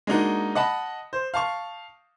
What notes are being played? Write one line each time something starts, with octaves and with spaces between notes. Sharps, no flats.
G#3 A#3 D4 D#4 F#4
D#5 F#5 A5 B5
C5
F5 A5 C#6